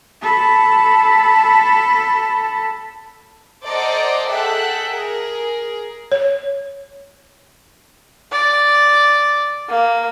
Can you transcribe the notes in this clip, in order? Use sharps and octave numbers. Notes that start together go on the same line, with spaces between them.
A4 B5
A4 C5 D5 D#5 F#5 A#5
G#4 A4 E5 F#5 G5 F#6
G#4 A#4
C#5
D5
A#3